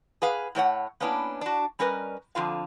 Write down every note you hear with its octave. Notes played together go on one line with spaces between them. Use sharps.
G#4 B4 F5
A2 A3 C#5 F#5
A#3 B3 C#4 D4 E4
D4 F#4
G3 C#4 A#4 B4 D#5
F2 D3 F4 F5